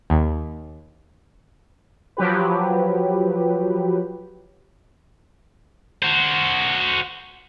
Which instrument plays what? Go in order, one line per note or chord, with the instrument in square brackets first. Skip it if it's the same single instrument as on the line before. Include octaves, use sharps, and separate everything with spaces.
[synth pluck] D#2
[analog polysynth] F3 F#3 G4 B4
[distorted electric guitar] F#4 C5